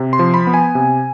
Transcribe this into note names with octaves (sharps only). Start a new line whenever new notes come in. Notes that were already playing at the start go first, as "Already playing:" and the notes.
Already playing: C3
C6
F3
B5
B3
G#5
C3